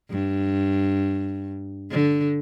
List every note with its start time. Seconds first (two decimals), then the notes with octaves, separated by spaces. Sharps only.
0.11 G2
1.91 D3